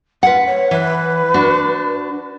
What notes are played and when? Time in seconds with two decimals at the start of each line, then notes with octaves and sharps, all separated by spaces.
0.23 F4 B4 F#5
0.46 C#5
0.71 E3 B4
1.34 D4 F#4